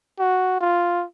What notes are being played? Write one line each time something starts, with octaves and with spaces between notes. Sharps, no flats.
F#4
F4